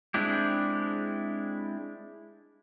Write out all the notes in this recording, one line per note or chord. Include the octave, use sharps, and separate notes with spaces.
G#3 C4 D4 E4 G4